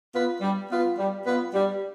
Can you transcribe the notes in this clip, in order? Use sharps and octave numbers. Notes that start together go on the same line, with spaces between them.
B3 F4 B4
G3
B3 F4 B4
G3
B3 F4 B4
G3